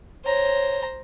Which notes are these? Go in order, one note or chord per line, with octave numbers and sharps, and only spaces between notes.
C5 C#5 A#5